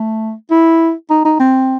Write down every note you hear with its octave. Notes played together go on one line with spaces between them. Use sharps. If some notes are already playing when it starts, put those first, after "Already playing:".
Already playing: A3
E4
D#4
D#4
C4